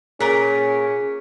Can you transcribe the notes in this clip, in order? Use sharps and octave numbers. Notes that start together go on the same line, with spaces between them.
A#2 C#4 G#4 A#4 F#6 B6